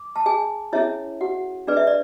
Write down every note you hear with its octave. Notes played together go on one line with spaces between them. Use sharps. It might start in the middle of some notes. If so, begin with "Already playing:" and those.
Already playing: D6
A5
G#4 G#5
C#4 E4 G#4 C#5 E5
F#4 F#5
D4 G#4 B4 D5
E5
D5